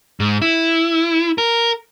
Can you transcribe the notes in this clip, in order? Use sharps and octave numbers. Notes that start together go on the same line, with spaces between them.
G#2
E4
A#4